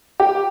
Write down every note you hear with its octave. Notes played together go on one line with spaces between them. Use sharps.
G4